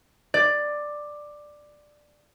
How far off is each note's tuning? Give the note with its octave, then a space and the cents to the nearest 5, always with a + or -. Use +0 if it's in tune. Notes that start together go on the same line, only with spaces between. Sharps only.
D5 +10